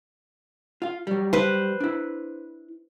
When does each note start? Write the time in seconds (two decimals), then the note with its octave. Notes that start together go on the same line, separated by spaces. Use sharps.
0.82 F4 F5
1.07 F#3 G3
1.33 B4 C5
1.80 D4 E4